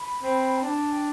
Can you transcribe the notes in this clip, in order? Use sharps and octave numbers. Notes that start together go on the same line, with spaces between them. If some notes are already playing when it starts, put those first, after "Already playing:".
Already playing: B5
C4
G5
D4 A5
G5